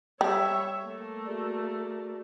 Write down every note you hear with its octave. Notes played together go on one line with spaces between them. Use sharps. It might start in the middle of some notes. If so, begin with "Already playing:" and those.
G3 C#5 E5
A3 A#3
F#4 G#4 D5